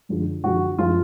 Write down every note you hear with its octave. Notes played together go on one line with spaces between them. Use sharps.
F#2 D3 F3 G#3
F#2 D3 F3 G#3 F#4
F#2 F3 G#3 F4